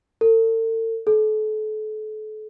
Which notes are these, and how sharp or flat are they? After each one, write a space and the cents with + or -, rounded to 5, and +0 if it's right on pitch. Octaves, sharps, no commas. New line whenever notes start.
A4 +40
A4 -35